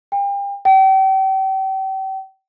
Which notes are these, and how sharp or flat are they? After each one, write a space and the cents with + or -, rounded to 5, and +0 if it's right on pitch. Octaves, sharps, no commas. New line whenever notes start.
G5 +35
G5 -35